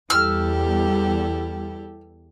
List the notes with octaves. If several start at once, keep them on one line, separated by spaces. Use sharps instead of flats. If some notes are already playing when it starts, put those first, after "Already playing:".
E2 G3 E4 G4 A4 E6 F6